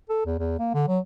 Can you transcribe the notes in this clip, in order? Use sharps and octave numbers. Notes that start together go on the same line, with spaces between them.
A4
E2
E2
A#3
D3
F#3